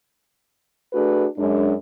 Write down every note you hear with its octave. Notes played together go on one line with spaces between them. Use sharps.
A3 D4 F#4 G#4 A4 B4
F#2 G#3 D4